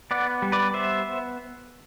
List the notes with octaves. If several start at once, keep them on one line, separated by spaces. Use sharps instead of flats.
B3 D5 F#5
G3
B4 D5
B3 C5 E5